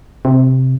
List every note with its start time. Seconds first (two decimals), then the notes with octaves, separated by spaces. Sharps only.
0.25 C3